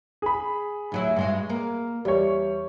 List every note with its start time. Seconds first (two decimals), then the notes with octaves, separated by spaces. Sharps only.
0.22 G#4 B5
0.92 D2 F#3 E4
1.16 G2 G#3 F#4
1.49 A#3 A#4
2.05 E2 G3 C#5